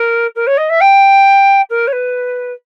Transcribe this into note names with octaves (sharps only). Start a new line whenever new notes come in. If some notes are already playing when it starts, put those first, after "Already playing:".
Already playing: A#4
A#4
C#5
D#5
E5
G5
A#4
C#5
B4